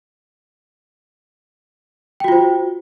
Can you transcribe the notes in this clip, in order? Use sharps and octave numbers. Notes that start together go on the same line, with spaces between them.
F4 F#4 C5 G5